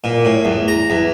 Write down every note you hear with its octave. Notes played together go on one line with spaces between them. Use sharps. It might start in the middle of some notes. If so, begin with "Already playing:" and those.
A#2
A2
E2
A#5
E2